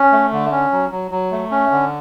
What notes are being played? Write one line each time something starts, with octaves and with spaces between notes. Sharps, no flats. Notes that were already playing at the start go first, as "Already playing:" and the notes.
Already playing: C#4
A3
D3
C#4
F#3
F#3
F#3
A3
C#4
D3